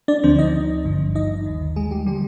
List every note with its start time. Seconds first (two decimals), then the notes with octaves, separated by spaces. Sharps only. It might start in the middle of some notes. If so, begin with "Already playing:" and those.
0.08 D4 D5
0.23 D2 D3 F3 C4 C5
0.39 D#4 D#5
0.85 G#1 G2 D3 F3
1.15 D#4 D#5
1.46 D#2 D#3
1.76 G#3 G#4
1.91 G3 G4
2.06 D3 F3 G3 G4